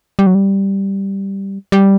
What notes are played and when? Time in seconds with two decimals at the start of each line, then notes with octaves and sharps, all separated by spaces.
0.19 G3
0.27 F#3
0.35 G3
1.72 G3